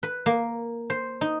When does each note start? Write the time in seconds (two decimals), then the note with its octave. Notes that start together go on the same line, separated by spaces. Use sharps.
0.03 B4
0.26 A#3
0.90 C5
1.21 D#4